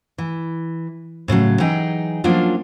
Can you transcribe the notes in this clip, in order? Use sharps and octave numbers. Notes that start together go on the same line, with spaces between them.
E3
A2 C#3 E3 F#3
E3 F#3 D#4 G#4 G5
F3 F#3 A#3 C#4 D4 F4